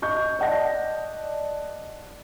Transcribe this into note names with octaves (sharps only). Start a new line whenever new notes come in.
D#5 C#6 G6
D5 D#5 F#5 A5 A#6